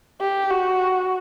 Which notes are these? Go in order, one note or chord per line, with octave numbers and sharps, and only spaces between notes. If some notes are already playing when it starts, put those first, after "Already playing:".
G4
F#4